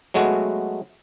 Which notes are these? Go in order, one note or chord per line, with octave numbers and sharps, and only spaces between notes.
F#3 G#3 A3 B3 F#4